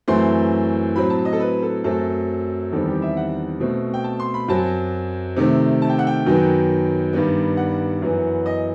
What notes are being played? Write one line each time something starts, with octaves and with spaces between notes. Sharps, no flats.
F#2 E3 A3 C4 C6
A2 F#3 C4 B5
A5
D#5
A4
B4
A4
F#2 F#3 A3 C4 A4
E2 D#3 G3 C4 A4
G4
E5
F#5
B2 A3 C4
G5
A5
C6
B5
F#2 F#3 C4 A5
C3 D#3 A3 C4
A5
G5
F#5
G5
F#2 D#3 F#3 B3
G2 D#3 G3 B3
F#5
F#2 E3 B3
D#5